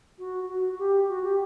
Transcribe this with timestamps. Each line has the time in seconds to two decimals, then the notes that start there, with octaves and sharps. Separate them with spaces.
0.19 F#4
0.48 F#4
0.79 G4
1.09 F#4
1.24 G4